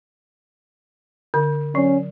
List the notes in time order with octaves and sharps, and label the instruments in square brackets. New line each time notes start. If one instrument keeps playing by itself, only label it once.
[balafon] D3
[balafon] F#3 [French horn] C#4